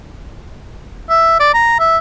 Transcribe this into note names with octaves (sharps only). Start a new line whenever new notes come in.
E5
D5
A#5
E5